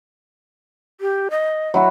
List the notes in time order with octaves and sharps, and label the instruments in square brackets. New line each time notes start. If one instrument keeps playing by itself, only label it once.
[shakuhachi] G4
D#5
[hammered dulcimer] F#3 E4 F#4